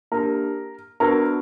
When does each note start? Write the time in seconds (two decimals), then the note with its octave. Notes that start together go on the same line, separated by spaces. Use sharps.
0.12 A#3 D4 G4 A#4
1.00 B3 D4 F#4 A#4 B4